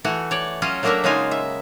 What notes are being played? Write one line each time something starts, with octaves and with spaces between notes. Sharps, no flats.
E3 A3 F#4
C#5 D5
F#3 C#4 F4 D#5
F#3 A3 A#3 D4 A#4 E5
C#3 F#3 G#3 D#4 F4 G#5
E5